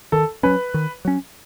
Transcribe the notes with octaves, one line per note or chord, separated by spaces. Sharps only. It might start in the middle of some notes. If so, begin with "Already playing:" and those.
D#3 A4
F#3 C#4 B4
D#3
F#3 C#4